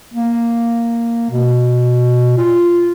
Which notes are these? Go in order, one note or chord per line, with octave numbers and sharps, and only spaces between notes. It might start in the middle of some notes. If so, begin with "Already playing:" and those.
A#3
B2
F4